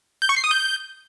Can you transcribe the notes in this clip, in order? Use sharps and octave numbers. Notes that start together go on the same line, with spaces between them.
G6
C#6
C7
D#6
G6